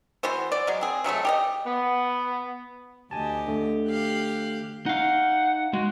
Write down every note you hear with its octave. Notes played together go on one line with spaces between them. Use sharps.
E3 B3 F#4 C5
D5
F#3 G#3
C4 G#4
C3 F#3 G#3 A3
G4 D5 D#5
B3
D2 G4 D#5 G#5 A5
D3 A3
G4 F5 F#6
D#4 F5 F#5
G#3 F#4